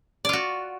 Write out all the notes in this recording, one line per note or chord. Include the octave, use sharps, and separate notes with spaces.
F4 F#4 D5